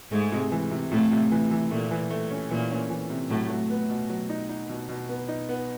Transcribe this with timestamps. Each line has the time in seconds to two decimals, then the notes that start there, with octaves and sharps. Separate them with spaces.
0.12 G#2 G#3 A3
0.32 C3
0.52 E3
0.71 C3
0.92 A2 C3 A3
1.11 C3
1.32 E3
1.51 E3
1.71 A#2 A3 A#3
1.91 E3
2.10 A3
2.30 C#4
2.50 A#2 E3 A#3
2.71 C#4
2.90 E3
3.10 C3
3.30 A2 F#3 A3
3.49 F#3
3.70 B3
3.89 B2
4.09 F#3
4.29 D#4
4.49 D#4
4.69 B2
4.88 B2
5.09 B3
5.28 D#4
5.49 B3